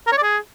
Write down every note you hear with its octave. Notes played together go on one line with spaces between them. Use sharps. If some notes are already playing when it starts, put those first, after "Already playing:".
A#4
C#5
D5
G#4